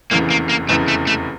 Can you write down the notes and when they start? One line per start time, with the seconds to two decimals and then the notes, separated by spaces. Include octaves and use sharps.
0.11 F1 E2 C#3 E3 A#3
0.30 A#3
0.49 A#3
0.69 F1 E2 C#3 E3 A3
0.88 A3
1.07 A3